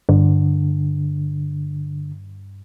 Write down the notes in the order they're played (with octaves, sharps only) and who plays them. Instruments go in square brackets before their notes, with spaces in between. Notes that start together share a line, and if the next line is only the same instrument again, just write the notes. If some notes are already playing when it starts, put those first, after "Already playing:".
[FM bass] G2 [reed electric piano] D3